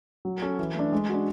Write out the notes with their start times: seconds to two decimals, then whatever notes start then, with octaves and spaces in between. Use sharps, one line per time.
0.25 F#3
0.42 C#4 F#4 A4
0.59 E3
0.75 A3 D4
0.92 G#3
1.09 D4 F#4